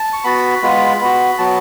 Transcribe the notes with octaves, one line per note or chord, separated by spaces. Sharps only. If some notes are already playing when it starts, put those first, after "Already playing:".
Already playing: A5
C#6
B3 F#4 B5
G#3 B3 F4
B3 F#4
F#3 B3 F#4 A5